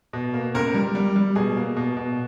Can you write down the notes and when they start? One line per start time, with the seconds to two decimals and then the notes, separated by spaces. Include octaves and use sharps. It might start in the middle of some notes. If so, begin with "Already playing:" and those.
0.13 B2
0.34 A#3
0.55 C#2 A#4
0.74 G3
0.95 G3
1.16 G3
1.36 B2 G#4
1.57 A#3
1.77 B2
1.97 B2